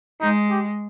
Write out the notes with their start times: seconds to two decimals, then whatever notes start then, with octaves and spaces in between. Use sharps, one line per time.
0.21 G#3 D#4
0.50 G4